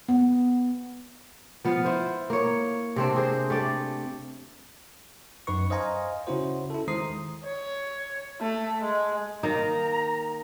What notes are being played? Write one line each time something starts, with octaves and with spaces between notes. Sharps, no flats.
B3
F3 B3 F5
E4 C5
A#3 C#5
C3 C4 D4
G#4 C5
A3 G4 D5
F#2 D#4 B4 C#6
C5 D#5 F5 G#5 A#5
C#3 C#4 E4 F#4 C5
E4 A4
D#3 G#3 C5 A#5 D#6 C7
C#5
A3
G#3
D#3 A#3 D#4 A#5